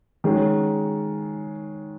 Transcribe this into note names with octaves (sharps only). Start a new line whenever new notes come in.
D#3 G#3 C#4 F#4